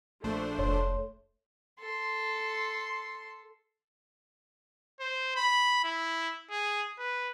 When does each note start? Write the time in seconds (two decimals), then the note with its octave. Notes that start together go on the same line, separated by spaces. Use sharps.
0.24 A#1 A3 D4 C5
0.59 F1 C#5 C6
1.79 A4 C6
5.00 C5
5.36 B5
5.84 E4
6.50 G#4
6.99 B4